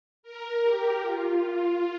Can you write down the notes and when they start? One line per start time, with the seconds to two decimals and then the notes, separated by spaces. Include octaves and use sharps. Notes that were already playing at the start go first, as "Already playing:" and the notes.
0.23 A#4
0.63 G4
1.02 F4